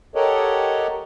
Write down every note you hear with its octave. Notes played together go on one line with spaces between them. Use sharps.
G4 A4 A#4 C#5 D#5 F#5